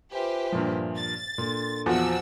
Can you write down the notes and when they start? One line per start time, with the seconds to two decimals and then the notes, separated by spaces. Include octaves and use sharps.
0.12 F4 G4 B4 C5 E5 G#5
0.52 G2 A#2 F3
0.97 A6
1.38 A#2 D4 A4 C6
1.86 E2 F3 F#4 C5 F#5 A5 E6